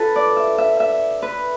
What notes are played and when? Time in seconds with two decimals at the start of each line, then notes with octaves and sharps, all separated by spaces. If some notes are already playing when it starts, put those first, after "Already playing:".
Already playing: D4 F4 A4 B4
0.16 D5
0.37 E5
0.58 E5
0.80 E5
1.22 B4